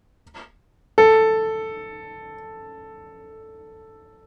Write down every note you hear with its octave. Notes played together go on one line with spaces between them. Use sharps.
A4